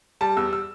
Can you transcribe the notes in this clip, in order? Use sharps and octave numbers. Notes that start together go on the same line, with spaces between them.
G3 A5
E2 E6
E6